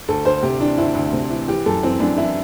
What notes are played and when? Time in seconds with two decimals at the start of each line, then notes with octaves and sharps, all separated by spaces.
0.08 D2 A4
0.25 D2 C5
0.43 C3 G4
0.60 E3 D4
0.78 D2 E4
0.95 D2
1.13 C3
1.30 E3
1.47 E3 G4
1.66 F#2 A4
1.83 E3 C4
2.00 F#2 D4
2.18 E3 E4